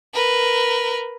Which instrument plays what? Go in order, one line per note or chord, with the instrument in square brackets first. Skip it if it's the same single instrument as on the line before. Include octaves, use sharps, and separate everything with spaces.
[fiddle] A#4 B4